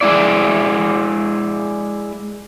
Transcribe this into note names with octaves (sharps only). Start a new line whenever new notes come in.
G#3 E4 D5